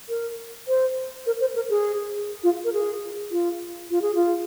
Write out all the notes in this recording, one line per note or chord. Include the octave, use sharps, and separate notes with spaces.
A#4
C5
A#4
C5
A#4
G#4
F4
A#4
G#4
F4
F4
G#4
F4